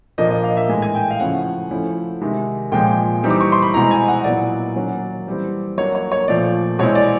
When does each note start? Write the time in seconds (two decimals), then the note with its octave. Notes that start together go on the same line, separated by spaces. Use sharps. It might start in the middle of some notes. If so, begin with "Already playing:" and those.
0.18 A#2 F3 A#3 D4 D#5
0.31 D#5
0.44 F5
0.57 E5
0.68 A2 E3 G#3 G#5
0.82 G#5
0.95 G5
1.11 F5
1.20 C#3 F3 A3 C#4 E4 F#5
1.71 F3 A3 C#4 E4
2.21 C3 D#3 G#3
2.72 A#2 F3 G#3 G5
3.23 E3 G3 C4 D#4
3.30 D6
3.41 C#6
3.52 C6
3.62 B5
3.74 B2 G#3 C4 E4 A#5
3.91 G#5
4.08 F#5
4.24 A#2 F#3 B3 E4 D5
4.76 D#3 F#3 A#3 C#4
5.27 E3 G3 C4
5.78 F#3 A#3 D4 C#5
5.95 C#5
6.12 C#5
6.28 A#2 F3 A3 D5
6.79 B2 G#3 C4 E4 C#5
6.95 D5